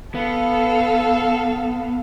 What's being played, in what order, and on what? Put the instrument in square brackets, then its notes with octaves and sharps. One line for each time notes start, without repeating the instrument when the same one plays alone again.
[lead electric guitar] B3 [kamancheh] A4 F5